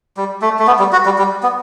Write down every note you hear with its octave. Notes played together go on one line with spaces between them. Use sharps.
G3
A3
A3
B3
G3
F#4
G3
G3
B3